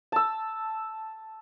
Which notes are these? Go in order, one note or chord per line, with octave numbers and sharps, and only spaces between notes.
A5 E6